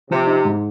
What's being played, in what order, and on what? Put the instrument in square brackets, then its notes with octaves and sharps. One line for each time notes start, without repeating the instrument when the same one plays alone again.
[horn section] C3 [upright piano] F3
[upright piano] D#4
G#2